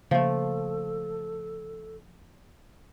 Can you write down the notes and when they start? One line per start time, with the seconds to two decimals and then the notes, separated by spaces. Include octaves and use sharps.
0.11 C#3 F3 A3 A#3 A4